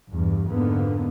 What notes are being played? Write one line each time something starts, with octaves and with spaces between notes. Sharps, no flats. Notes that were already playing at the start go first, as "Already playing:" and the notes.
E2 G2
F2 G#2 D3 A#3 B3